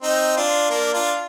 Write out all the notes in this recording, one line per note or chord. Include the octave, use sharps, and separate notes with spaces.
C4 D#4
D4 F4
A#3 D4
D4 F4